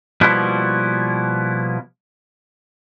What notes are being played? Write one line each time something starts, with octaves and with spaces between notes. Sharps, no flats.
B2 F3 G3 A#3 B3 E4